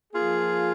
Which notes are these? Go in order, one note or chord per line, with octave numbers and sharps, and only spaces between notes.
F3 A#3 F4 G#4